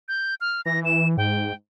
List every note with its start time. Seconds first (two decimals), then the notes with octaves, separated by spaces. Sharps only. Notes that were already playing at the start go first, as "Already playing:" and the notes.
0.08 G6
0.41 F6
0.66 E3 A#6
0.85 E7
1.17 G#2 G5